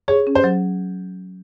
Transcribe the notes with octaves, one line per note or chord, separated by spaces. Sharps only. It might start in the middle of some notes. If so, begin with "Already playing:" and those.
G#4 C#5
C#4
C5
F#3